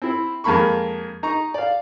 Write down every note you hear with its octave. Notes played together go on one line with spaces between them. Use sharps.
C4 E4
F2 G#3 A#3 B5 C#6
D#4 A#5 C#6
D5 F5